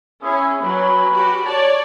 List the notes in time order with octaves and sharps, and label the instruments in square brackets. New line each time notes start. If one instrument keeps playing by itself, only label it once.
[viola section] C#4 [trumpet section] E4 G#4
[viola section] F#3 [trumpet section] C#4 B4 B5
[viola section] F#4 G4
[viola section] C#5 D5 [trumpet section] A5